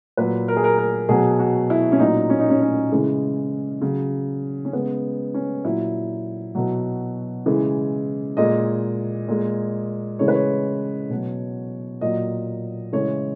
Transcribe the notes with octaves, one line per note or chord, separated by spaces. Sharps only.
A#2 F#3 B4
A#4
G#4
A#4
A#4
B2 F#3 G#4
F#4
E4
C#4
A#2 F#3 D#4
C#4
D#4
C#4
C#4
C#3 E3 G#3
C#3 F#3
C#4
C#3 G#3 B3
C#4
A#2 F#3 E4
B2 F#3
C#3 E3 G#3
A#2 G#3 D#5
A#2 G#3
C#3 E3 G#3 C#5
B4
C#5
B2 F#3
A#2 F#3 D#5
C#3 E3 G#3 C#5